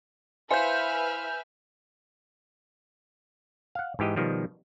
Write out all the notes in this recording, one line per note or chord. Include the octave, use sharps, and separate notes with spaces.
E4 B4 C5 E5 F5 G#5 F6 G6
F5 F#5
G#2 E3 G4 D#5
B2 D#3 F3 G3